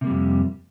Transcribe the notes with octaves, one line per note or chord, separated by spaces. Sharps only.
F2 C3 G3 A#3